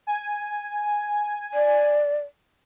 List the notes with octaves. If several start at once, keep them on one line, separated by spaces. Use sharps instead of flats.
G#5
D5